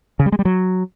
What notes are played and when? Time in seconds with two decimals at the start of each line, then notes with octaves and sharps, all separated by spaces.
0.19 C#3
0.26 G3
0.32 G#3
0.39 G3
0.45 F#3